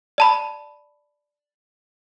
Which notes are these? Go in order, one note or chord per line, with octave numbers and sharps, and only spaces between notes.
D5 A5 B5